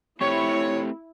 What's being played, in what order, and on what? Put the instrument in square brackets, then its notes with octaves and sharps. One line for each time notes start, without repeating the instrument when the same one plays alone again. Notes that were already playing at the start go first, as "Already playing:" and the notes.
[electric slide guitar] A3 C4 G4 [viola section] E4 [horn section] C#5